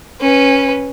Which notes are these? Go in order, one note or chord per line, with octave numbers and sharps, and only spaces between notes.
C#4 B4